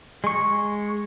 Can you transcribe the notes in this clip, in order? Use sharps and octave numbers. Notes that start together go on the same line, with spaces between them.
G#3 C#6